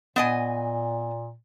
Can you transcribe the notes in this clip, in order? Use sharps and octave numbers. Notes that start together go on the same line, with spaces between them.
A#2 B3 D#5 G#5